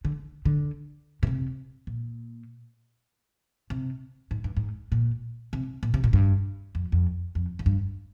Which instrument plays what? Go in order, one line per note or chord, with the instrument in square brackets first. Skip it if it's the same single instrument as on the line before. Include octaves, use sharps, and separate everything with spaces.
[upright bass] D3
D3
A#2
C3
A#2
C3
G#2
G2
G#2
A#2
C3
A#2
C3
A#2
G2
F2
F2
F2
F2
G2